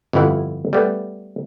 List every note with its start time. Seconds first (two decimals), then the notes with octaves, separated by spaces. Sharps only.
0.13 G1 F2 F3 E4 F#5
0.73 G3 A3 B3